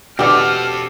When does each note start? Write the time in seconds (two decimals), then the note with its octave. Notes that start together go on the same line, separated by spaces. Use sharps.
0.19 B2 D3 C4 G4 A4 F6